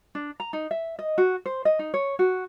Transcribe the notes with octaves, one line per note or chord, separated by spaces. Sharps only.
D4
A#5
D#4
E5
D#5
F#4
C5
D#5
D#4
C#5
F#4